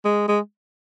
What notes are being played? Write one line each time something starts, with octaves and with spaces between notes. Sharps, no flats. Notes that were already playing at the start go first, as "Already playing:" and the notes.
G#3
G#3